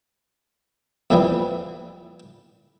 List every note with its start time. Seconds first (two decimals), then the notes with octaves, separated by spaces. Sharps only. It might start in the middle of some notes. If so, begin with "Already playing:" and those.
1.10 F2 A#2 E3 F3 G3